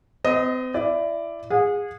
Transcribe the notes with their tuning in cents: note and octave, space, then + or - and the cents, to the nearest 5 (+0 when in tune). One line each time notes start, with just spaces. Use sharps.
C4 -40 D#5 +0
E4 +20 D5 +0
G#4 -20 F#5 -45